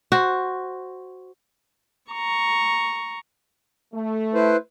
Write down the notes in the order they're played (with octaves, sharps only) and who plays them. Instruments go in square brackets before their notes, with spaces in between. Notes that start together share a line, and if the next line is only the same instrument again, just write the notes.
[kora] F#4 C5
[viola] A#5 C#6
[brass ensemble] A3
[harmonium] E4 B4 C5